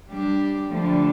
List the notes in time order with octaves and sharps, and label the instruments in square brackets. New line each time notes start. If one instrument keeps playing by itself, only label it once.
[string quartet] G3 D4 G4
[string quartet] D3 G3 D4 [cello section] F3 A3